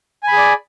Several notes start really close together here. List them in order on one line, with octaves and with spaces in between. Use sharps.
G#5 B5 G#4 D5